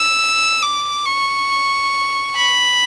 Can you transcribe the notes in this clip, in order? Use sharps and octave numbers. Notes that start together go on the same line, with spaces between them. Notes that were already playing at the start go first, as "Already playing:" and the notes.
Already playing: E6
D6
C#6
B5